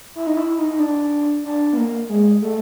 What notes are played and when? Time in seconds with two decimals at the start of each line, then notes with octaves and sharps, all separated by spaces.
0.15 E4
0.27 D#4
0.37 E4
0.58 D#4
0.70 D#4
0.80 D4
1.44 D4
1.73 B3
1.77 A#3
2.09 G#3
2.42 A3